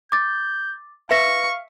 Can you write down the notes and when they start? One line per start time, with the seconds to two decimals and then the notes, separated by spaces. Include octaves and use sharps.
0.12 D6 G6 A6
1.11 B4 E5 F5 C#6 A#6